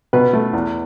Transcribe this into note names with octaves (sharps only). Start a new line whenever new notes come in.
B2 B4
A3
E2